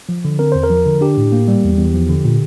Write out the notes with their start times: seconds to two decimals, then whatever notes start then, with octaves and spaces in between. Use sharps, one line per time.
0.09 F3
0.25 D3
0.39 C4 A#4
0.52 E2 C5
0.64 A#4
0.70 F3
0.86 D3
1.01 D4 G4
1.17 A2
1.32 A#3
1.48 G3
1.64 E2
1.78 E2
1.94 F3
2.09 D3
2.25 A#2